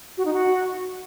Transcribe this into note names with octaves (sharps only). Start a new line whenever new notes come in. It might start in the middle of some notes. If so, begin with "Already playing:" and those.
F#4
D#4
F#4